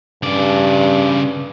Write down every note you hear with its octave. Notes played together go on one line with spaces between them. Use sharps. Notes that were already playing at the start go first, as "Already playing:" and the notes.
G2 C#3 D5